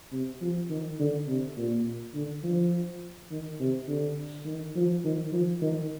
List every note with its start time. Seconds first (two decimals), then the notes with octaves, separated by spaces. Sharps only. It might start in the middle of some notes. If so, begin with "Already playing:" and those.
0.12 C3
0.41 F3
0.70 D#3
0.99 D3
1.28 C3
1.57 A#2
2.15 D3
2.43 F3
3.31 D#3
3.60 C3
3.88 D3
4.46 D#3
4.76 F3
5.04 D#3
5.32 F3
5.62 D#3